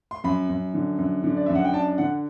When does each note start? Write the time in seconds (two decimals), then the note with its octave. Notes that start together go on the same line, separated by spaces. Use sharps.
0.11 C6
0.24 F#2 B5
0.49 F#2
0.74 D3
0.98 F#2
1.24 D3
1.37 D5
1.46 F#2 E5
1.55 F#5
1.65 G5
1.74 D4 A5
1.98 D3 F#5